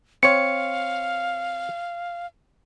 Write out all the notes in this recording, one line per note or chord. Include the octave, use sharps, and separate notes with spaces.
C4 C#5 F5 C#7